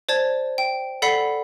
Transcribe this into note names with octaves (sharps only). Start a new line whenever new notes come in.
C5 D5 A5 G#6
G5
A4 D5 F#5 B5 B6 C7